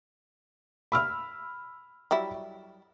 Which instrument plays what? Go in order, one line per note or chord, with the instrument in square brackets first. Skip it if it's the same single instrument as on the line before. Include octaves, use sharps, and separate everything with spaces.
[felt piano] B5 E6 F6
[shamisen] F#3 G3 E4